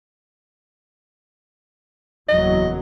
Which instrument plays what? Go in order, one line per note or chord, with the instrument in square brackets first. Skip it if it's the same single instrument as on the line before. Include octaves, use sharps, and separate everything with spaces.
[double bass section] F#1 E2 F#3 [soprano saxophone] D#5